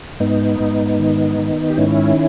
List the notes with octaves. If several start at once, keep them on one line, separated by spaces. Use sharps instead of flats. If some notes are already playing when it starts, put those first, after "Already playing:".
G#2 B3 D#4
G#2
D#3
D#3
G4
G#2 C#4 E4